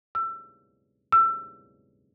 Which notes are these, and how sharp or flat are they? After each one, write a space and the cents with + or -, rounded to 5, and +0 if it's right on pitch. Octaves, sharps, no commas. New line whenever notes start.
E6 +25
E6 +25